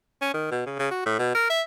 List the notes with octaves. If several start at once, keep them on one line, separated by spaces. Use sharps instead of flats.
C#4
D#3
B2
C#3
C#3
F#4
A2
B2
A#4
E5